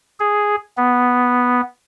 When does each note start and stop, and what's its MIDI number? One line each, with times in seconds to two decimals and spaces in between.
0.20 0.56 68
0.77 1.61 59